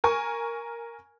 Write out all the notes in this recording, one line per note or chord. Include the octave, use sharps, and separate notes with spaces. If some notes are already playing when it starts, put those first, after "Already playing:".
A#4 G#5 C#6